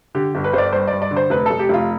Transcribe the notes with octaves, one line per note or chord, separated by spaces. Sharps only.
D3 G4
G1
B4
G1 C5 D5
G2 C5
G2 D5
D5
D3
C5
F1 B4
F1 A4
G4
F1 F4